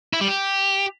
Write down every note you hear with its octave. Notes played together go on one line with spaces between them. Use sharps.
E4
G3
G4